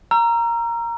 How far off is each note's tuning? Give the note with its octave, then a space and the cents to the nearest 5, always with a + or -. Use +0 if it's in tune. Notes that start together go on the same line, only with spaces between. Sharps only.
A#5 +0 E6 +45